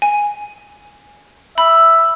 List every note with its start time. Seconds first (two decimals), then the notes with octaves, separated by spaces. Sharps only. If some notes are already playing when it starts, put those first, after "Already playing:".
0.02 G#5
1.58 E5 B5